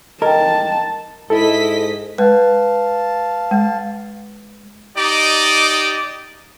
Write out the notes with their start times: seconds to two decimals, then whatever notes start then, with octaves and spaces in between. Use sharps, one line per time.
0.22 A#4 D#5 G5 A5
1.30 G#2 E4 A4 D#5 B6
2.18 G#3 B4 F5 A5
3.51 G#3
4.97 D#4 G4 D5 D#5 D6